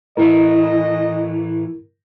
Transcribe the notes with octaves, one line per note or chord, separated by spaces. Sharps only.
A2 E3 A3 E4 A#4 D#5